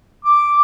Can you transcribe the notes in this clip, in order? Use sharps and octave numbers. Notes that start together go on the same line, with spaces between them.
D6